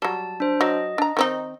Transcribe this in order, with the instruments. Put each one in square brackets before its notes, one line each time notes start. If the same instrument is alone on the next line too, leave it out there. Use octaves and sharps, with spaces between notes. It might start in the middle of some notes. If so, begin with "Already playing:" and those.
[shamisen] F#3 G3 [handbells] A5
[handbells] D4 C5
[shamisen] F#3 [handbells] D#5
[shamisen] D4 A#5
D#3 C4 D#4